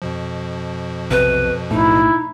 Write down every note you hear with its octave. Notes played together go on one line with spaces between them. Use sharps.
F2 B2 F3
B1 C3 B4
B1 A2 D#4 E4